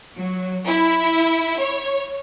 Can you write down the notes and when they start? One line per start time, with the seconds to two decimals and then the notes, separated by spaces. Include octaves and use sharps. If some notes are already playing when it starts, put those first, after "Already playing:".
0.14 F#3
0.66 E4
1.58 C#5